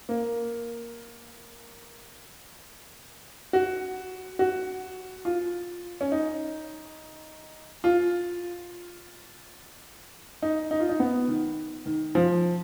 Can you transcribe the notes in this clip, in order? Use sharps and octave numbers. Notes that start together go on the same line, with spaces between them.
A#3
F#4
F#4
F4
C#4
D#4
F4
D#4
D#4
F4
D#4
B3
D#3
D#3
F3